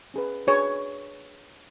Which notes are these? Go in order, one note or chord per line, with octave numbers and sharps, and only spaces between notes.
C#4 G#4 B4
D4 G#4 B4 C#5